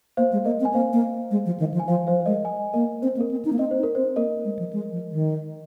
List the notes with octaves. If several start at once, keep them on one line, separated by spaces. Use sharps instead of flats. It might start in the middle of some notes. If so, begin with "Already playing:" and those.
A#3 C5 F5
G#3
A#3 A#4 D#5
C4
G#5
A#3 C5 F5
A#3
G#3
F3
D#3
F3
G#5
F3 C5 F5
F3 C5 F5
C5
G#3 A#4 D#5
D#5 G#5
A#3 A#4 D#5
C4 C5
A#3
A#4
C4
D#4
A#3
C4 D#5
C5
D#4
A#4
C4 C5
A#3 A#4 D#5
G#3
F3
G#3
F3
D#3